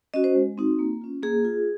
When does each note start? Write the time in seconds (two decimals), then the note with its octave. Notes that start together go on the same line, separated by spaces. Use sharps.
0.14 C#4 F#4 D#5
0.24 C5
0.35 G#3
0.58 C4 D#4 F#4
0.79 A#3
1.02 C#4 F4
1.23 A#3 G#4
1.44 F4